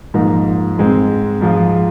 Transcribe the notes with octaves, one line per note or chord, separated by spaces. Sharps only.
G#2 F3 A#3 D#4
G#2 G#3 C4
G#2 F3 G#3 F4